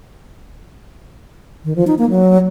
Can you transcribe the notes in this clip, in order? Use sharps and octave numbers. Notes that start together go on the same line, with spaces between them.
D#3
F3
D#4
A#3
F#3